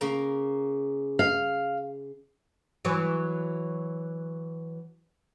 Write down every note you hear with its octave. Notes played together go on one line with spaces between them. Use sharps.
C#3 A#3 A#5
F5
E3 F#3